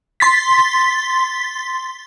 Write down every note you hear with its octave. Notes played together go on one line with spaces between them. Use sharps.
C6 A6 B6